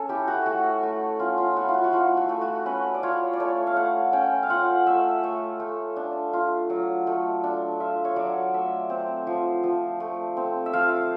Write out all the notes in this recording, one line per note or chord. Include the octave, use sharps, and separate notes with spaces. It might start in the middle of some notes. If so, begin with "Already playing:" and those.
Already playing: C#4 A4
E4 G4
F#4
A3 F#4
A3
C#4 F4
F4
E4 F#4
F4
F#4
F#4
A3 F4
F#4
A3
F#4
C#4 B4
D5
F4 C#5
D5
A3 C#5
F5
A3 F#5
C#4 G5
F5
F4 F#5
A3 E5
A3
A3
D4
F4
F#3
A3
D4
F4 E5
C#5
F#3 D5
A3 E5
C4
F3
F3
A3
C4
E5
F3 F5